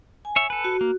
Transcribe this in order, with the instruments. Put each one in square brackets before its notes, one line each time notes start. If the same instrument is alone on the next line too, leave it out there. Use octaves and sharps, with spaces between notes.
[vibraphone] G#5
[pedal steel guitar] C#5 E5
A4 B4
[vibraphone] F#4
[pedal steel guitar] A#3